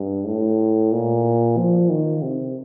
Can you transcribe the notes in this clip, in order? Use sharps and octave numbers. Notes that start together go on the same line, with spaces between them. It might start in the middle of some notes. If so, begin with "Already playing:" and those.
Already playing: G2
A2
A#2
F3
D#3
C3